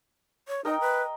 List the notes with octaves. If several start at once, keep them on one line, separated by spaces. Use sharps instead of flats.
C#5
D#4 A#4 D#5 G5
B4